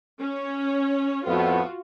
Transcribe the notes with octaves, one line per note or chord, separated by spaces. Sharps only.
C#4 C#5
F2 A2 B3 F4 F#4